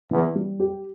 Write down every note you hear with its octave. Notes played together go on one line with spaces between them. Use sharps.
E2 E3
G3
G4